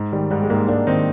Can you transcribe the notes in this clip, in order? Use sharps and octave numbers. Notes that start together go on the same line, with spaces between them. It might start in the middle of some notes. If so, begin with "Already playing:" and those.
Already playing: G#2
D#3 G3
G#2 G3
G#3
G#2 G3 A#3
G#2 A#3 D4
D#3 C4 D#4